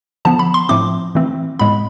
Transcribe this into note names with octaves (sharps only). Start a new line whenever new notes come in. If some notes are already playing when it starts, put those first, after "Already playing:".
D3 F3 B3 A5
B5
C6
A2 F3 A3 C4 D6
E3 A3 C4
A2 G#3 B3 B5